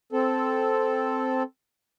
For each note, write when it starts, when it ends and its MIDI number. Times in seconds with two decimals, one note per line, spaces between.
0.12 1.43 60
0.12 1.43 69